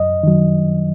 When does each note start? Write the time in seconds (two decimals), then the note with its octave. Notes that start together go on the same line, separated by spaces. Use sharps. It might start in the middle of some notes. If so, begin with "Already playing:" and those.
Already playing: F#2 D#5
0.23 D#3 F#3